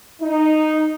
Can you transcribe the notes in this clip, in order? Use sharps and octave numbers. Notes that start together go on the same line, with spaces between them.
D#4